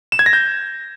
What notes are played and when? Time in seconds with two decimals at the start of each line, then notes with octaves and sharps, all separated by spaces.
0.12 E7
0.19 G#6
0.26 A#6
0.33 G6